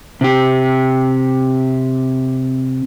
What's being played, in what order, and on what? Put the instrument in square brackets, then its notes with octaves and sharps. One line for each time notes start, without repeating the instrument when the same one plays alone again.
[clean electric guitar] C3 G4